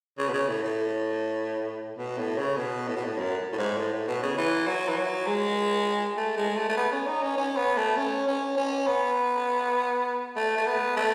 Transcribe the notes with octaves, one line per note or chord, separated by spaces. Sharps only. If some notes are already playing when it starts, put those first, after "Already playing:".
C#3
B2
C#3
A2
A2
B2
A2
C#3
B2
A2
B2
A2
F#2
A2
G#2
A2
A2
B2
C#3
E3
F#3
E3
F#3
G#3
A3
G#3
A3
A3
B3
C#4
D#4
C#4
C#4
B3
A3
C#4
C#4
C#4
B3
A3
A3
B3
A3